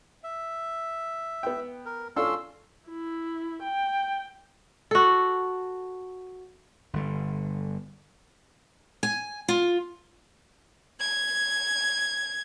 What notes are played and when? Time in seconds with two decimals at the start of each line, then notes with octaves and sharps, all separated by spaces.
0.24 E5
1.43 B3 G5
1.86 A#4
2.16 C#4 D4 F4 A4 C6 E6
2.89 E4
3.63 G5
4.91 F#4 A4
6.93 G1 D3
9.03 G#5
9.48 F4
10.99 G#6